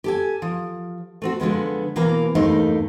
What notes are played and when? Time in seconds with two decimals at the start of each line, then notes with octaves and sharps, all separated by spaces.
0.04 G4 A4 G#5
0.42 F3
1.22 A3 C4 F#4
1.40 D3 F3 G#3 B3
1.96 B2 E3 A#3 A#4 F5 A#5
2.35 E2 G2 A3 A#3 D#4 C5